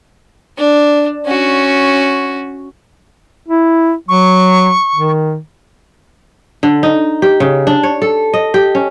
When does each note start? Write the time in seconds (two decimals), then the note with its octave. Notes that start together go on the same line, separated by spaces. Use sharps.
0.58 D4
1.26 C#4 F#4
3.48 E4
4.08 F#3 C#6
4.95 D#3
6.63 D3
6.83 D#4
7.22 G4
7.40 C#3
7.67 D4
7.83 C#5
8.02 A4
8.34 D#5
8.54 G4
8.75 C#4